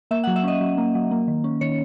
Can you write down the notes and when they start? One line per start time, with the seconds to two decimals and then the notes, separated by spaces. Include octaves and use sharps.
0.11 A#3 E5
0.24 F#5
0.27 F#3
0.36 E5
0.44 C#4 D#5
0.61 F#3
0.78 A#3
0.95 F#3
1.11 A#3
1.28 D#3
1.44 C#4
1.61 D#3 C#5